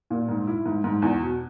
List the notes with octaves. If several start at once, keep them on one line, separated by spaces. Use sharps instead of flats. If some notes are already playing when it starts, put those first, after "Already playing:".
A#2
G#2
E4
G#2
G#2
E2
B2